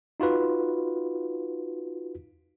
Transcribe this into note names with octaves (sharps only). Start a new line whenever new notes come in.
D#4 F4 F#4 B4